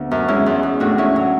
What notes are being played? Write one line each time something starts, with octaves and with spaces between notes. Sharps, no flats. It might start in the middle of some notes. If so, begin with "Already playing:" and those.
Already playing: D2 B3 D4
F#2
G#3 C#4 E4
E2
E2
A2 D4 F#4
A2 C#4 E4
F#3